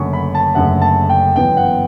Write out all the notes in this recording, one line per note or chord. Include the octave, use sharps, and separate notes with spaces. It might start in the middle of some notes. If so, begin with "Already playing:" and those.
Already playing: F#1 F#2 D3 A3 C#6
B5
A5
F#1 F#2 D3 A3 F#5
A5
G5
G1 F#2 E3 B3 G5
F#5